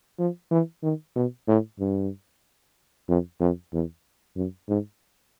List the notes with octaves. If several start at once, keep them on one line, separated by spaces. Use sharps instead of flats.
F3
E3
D#3
B2
A2
G2
F2
F2
E2
F#2
G#2